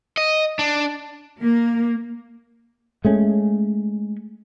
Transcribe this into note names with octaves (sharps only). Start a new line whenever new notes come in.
D#5
D4
A#3
G#3 A3 C#4